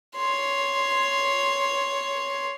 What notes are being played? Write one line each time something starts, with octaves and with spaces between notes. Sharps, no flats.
C#5 C6